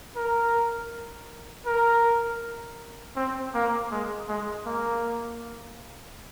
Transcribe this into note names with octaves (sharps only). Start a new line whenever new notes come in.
A#4
A#4
C4
A#3
G#3
G#3
A#3